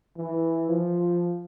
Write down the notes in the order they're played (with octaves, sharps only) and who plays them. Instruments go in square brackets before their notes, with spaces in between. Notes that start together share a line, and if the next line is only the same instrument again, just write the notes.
[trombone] E3
F3